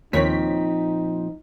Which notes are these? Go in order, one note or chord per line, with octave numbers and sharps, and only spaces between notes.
D#2 A#2 F3 C4 D#4 C#5 B6